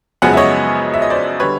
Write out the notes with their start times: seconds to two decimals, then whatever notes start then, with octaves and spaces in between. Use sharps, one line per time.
0.22 F#2 C#3 F3 G#3 B3 F#5 G#5
0.33 E5
0.37 C#5 D#5
0.94 E5
1.02 D#5
1.10 C5 D5
1.40 D3 G3 B4 C#5